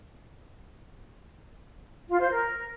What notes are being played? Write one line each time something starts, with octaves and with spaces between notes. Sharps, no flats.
F4
C5
A#4